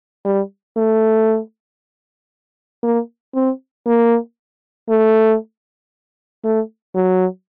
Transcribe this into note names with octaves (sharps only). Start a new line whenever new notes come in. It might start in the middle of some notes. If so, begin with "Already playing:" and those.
G3
A3
A#3
C4
A#3
A3
A3
F#3